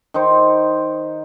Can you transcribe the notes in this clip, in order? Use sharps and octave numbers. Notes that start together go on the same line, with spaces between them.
D#3 D#4 C5